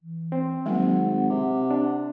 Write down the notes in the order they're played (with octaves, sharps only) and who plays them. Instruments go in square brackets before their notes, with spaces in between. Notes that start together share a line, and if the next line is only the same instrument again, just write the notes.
[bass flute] E3
[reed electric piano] C4
[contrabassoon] G#1 [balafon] F#3 G3 A#3 [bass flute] F#5
[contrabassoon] C3
[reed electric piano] D4